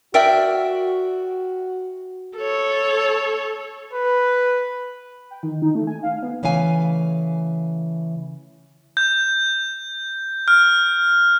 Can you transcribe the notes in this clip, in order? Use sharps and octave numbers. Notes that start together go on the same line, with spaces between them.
F#4 A#4 D5 E5 G5
A4 C#5
B4
G5
D#3
D#4
A3
G#5
F5
B3
C#3 E3 A3 F5 G#5
G6
F6